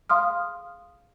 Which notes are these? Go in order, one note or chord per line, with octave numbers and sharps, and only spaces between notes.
F5 C6 D#6 F6